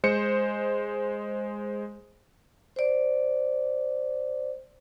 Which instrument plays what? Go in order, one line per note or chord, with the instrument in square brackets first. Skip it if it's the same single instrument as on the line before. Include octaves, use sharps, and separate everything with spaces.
[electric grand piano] G#3 C5 C#7
[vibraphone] C5 D5